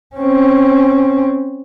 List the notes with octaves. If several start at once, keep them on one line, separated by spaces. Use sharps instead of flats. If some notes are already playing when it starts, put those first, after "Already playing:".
C4 C#4